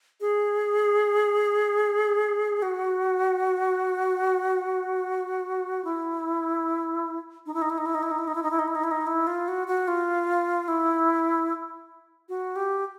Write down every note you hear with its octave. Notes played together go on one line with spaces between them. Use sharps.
G#4
F#4
E4
D#4
E4
D#4
E4
D#4
E4
D#4
E4
D#4
E4
D#4
E4
D#4
E4
D#4
E4
D#4
E4
D#4
E4
F4
F#4
F#4
F4
E4
F#4
G4